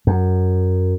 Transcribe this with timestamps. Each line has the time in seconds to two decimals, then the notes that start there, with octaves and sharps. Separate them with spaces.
0.07 F#2